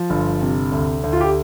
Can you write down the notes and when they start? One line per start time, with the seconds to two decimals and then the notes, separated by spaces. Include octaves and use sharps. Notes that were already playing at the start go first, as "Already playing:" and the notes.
Already playing: F3
0.10 G1
0.42 C3
0.72 D2
1.04 D2
1.13 F4
1.21 G4